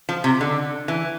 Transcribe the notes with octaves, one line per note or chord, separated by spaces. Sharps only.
F3
C3
D3
E3